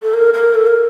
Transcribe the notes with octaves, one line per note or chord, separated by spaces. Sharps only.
A4
A#4
A#4
A4
A#4